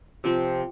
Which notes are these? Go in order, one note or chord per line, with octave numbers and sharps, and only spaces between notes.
C3 F3 C4